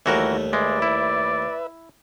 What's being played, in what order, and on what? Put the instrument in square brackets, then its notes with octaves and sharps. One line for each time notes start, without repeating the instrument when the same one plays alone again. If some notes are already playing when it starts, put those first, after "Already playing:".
[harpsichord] D#2 G3 A3 [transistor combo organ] D#3 [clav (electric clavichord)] E3 F#4 A#4
[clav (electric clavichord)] G#3 [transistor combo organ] B4 E5 [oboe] D5
[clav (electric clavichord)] E4